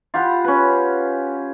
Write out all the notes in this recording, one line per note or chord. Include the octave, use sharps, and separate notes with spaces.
F4 G4 F#5 B5
C#4 B4